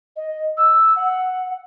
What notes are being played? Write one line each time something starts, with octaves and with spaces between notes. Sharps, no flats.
D#5
E6
F#5